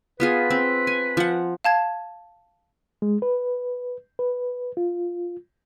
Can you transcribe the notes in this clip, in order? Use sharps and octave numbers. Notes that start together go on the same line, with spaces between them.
B3 F4 G#4 B4
C4
G#5
F3 F#5
F5 A5 G#6
G#3
B4
B4
F4